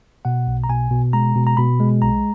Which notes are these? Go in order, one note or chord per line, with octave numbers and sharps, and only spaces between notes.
B2 F#5
B1
A#5
B2 G#5
B2
G#3 A#5
B2
A#5
B2 B5
G#3
B1 A#5